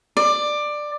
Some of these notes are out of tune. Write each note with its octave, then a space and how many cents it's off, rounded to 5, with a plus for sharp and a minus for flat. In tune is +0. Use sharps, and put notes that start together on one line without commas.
D5 +15